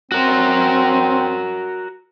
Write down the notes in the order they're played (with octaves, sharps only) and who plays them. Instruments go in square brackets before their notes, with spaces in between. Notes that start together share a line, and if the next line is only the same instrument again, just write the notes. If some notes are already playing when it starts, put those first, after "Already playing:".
[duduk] C4 [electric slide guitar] F#4 A#4